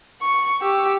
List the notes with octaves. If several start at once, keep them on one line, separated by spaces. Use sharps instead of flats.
C#6
G4 E6